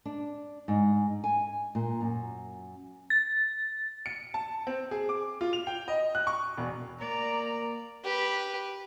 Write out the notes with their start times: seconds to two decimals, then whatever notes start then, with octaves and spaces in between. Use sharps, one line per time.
0.05 D4
0.68 G#2
1.24 G#5
1.75 A#2
2.01 F#2
3.10 A6
4.06 C#7
4.34 A5
4.67 C4
4.91 G#4
5.09 D6
5.41 F4
5.53 F7
5.67 G5
5.88 D#5
6.15 F#6
6.27 C#6
6.57 E1
7.01 A#3 D5 A#5
8.04 G4 B4